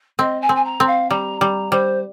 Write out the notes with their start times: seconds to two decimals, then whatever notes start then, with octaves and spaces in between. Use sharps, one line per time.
0.19 C4 D#5
0.41 G#5
0.49 C4
0.56 G#5
0.65 A#5
0.80 C4
0.87 F5
1.10 G3 A#5
1.41 G3 A#5
1.71 G3 C5